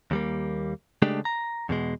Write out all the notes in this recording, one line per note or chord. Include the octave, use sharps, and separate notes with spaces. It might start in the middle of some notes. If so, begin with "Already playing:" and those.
D#2 G3 A#3
C#3 G#3 A3 D4 G4
A#5
E2 B2 G#3